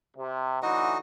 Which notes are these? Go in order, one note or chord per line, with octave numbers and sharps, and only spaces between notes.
C3
A2 D3 E3 D#4 F#4 D#5